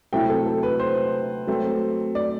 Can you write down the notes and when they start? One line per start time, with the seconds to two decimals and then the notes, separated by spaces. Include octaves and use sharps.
0.13 C3 F#3 A3 E4 G5
0.30 A4
0.46 A4
0.63 B4
0.80 C5
1.47 F#3 A3 C4
2.15 D5